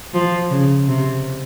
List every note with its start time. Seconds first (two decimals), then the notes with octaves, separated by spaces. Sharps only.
0.13 F3
0.50 C#3
0.88 C3